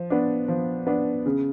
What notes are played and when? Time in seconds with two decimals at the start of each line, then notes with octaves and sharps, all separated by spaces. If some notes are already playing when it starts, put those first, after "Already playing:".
Already playing: F3
0.10 B3 D4
0.48 F3
0.87 B3 D4
1.26 C#3